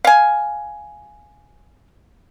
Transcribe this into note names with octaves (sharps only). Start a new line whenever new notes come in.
F5 G#5